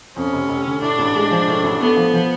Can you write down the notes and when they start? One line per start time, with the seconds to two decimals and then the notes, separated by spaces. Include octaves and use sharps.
0.16 F2 C#4
0.33 F1
0.49 F1
0.65 D3
0.82 A2 D4
0.99 A1
1.15 G#3
1.31 F3
1.47 A2
1.64 A1
1.80 A3 B3
1.97 F3
2.13 F3